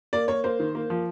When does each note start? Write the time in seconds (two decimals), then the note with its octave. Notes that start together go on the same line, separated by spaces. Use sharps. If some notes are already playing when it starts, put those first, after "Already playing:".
0.13 A#3 D5
0.28 A#3 C#5
0.44 A#3 C5
0.59 D#3
0.75 A#3
0.90 F3